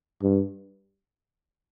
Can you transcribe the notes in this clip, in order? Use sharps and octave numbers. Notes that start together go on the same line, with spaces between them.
G2